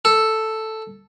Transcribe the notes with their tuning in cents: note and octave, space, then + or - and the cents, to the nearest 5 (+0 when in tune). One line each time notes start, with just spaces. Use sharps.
A4 +0